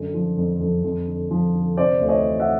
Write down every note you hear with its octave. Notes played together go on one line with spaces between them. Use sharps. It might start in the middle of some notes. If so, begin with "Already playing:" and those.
Already playing: F#2 D3
F3
F2
F2
F2
D3
F3
D3
C3 C5 D5
D2
C#5 D#5
E3
E5 F#5